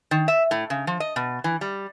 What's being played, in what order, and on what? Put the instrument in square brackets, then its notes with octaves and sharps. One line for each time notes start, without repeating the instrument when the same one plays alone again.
[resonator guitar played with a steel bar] D#3
E5
A2
C#3
F3
D#5
B2
E3
G3